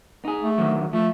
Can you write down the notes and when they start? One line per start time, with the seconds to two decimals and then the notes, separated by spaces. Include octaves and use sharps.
0.25 D#4 G#4
0.42 A3
0.58 D3 D#3 F#3
0.93 F3 A3